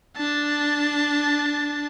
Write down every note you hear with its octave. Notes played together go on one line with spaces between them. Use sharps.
D4 A5